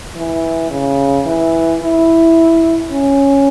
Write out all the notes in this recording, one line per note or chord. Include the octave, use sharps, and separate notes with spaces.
E3
C#3
E3
E4
C#4